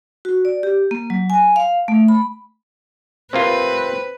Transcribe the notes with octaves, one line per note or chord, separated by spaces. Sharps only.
F#4
D5
G4
A#3
F#3
G#5
F5
A3
B5
C3 A#3 C4 F4 B4